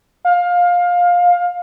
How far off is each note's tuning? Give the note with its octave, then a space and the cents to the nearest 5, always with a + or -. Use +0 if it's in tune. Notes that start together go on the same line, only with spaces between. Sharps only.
F5 +20